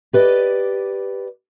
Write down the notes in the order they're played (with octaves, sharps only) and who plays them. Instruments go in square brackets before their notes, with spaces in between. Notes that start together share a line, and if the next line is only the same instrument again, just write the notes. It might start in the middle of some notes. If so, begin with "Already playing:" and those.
[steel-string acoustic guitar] G4 B4 D5 D#5